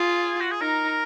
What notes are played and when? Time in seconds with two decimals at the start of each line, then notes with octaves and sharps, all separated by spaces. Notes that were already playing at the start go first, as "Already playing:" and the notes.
Already playing: F4 G#4
0.40 F#4
0.51 G#4
0.61 D#4 A#4